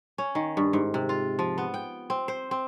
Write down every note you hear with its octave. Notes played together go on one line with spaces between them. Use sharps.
C#4
D#3
G2
G#2
C3
F4
F3
B3
G5
C4
C5
C4